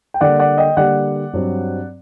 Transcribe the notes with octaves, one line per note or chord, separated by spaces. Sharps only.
G5
D3 G3 A#3 D5 F#5
D5 F#5
D#5 G5
D3 G3 A#3 D5 F#5
G2 F#3 C4